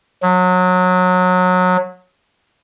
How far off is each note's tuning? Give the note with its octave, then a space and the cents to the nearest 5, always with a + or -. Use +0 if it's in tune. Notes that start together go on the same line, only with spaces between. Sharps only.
F#3 -25